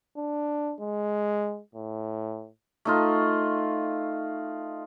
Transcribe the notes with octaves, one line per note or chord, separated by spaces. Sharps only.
D4
G#3
A2
A3 D#4 F4